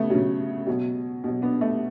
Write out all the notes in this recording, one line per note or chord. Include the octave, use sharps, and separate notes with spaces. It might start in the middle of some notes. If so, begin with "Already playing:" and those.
Already playing: C#3 A3 B3
C#3 F#3
B2 F#3
B2 F#3
B3 D4
A3